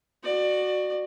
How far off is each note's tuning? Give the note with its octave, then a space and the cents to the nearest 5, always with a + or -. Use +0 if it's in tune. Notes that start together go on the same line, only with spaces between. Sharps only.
F#4 +0 D5 +25